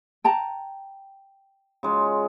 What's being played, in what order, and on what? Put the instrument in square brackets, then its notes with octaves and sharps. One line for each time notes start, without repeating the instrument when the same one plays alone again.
[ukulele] G5 A5 A#5
[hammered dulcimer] C#3 G#3 F4